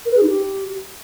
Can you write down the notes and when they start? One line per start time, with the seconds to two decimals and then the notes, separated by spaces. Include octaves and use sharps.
0.05 A#4
0.11 B4
0.16 G#4
0.22 D#4
0.28 G4